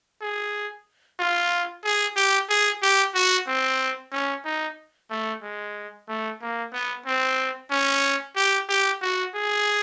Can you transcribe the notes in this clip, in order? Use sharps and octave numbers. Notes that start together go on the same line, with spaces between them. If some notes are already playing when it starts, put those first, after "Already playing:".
G#4
F4
G#4
G4
G#4
G4
F#4
C4
C#4
D#4
A3
G#3
A3
A#3
B3
C4
C#4
G4
G4
F#4
G#4